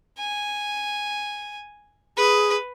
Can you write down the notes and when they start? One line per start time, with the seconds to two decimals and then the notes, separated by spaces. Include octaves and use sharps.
0.19 G#5
2.17 G#4 B4